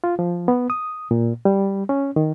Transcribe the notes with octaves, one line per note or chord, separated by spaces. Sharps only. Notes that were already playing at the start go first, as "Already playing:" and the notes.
F4
F3
B3
D#6
A#2
G3
C#4
D#3